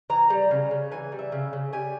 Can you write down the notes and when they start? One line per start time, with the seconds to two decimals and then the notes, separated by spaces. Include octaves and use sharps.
0.10 E3 A#5
0.30 G3
0.51 C#3
0.71 C#3
0.92 E3 G#5
1.12 G3
1.19 E5
1.32 C#3
1.53 C#3
1.73 G3 G#5